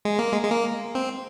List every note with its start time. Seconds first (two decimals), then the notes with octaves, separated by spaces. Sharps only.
0.05 G#3
0.19 A#3
0.32 G#3
0.43 G#3
0.50 A#3
0.95 C4